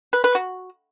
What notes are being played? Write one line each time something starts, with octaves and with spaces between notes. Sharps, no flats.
B4
B4
F#4